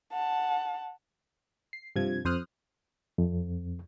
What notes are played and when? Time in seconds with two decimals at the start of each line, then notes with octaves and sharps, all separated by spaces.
0.12 F#5 A5
1.73 C7
1.96 G2 C3 F3 G#6
2.25 F2 C5 D#6 F6 F#6
3.18 F2